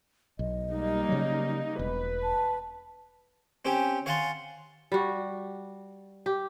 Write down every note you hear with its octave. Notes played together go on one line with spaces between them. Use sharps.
B1 D#5
G3 A#3 D#4
C#3 F#3
E1 B4
A5
C4 C#4 G4 G5 G#5
C#5 F5 F#5 G#5 A5 C6
G3 F#4
G4